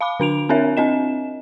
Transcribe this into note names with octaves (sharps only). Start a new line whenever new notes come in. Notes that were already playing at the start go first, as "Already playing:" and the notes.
F5 B5 D6
D3 D4 D7 F7
C4 D4 A#4 C#5 E5
C4 D4 D#5 E7